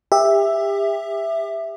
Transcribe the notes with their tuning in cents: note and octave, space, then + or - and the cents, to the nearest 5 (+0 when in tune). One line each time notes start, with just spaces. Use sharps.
G4 +30 E5 +0